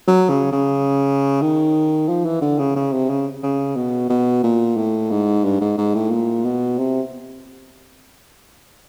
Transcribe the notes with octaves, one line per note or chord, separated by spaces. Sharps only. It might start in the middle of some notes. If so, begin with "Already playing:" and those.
F#3
C#3
C#3
D#3
F3
E3
D3
C#3
C#3
C3
C#3
C#3
B2
B2
A#2
A2
G#2
G2
G#2
G#2
A2
A#2
B2
C3